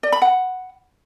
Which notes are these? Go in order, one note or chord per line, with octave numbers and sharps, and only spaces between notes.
D5
B5
F#5